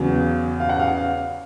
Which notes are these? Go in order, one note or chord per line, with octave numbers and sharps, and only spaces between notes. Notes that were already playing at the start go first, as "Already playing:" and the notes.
Already playing: E2 C#3 F#3
F5
F#5
F5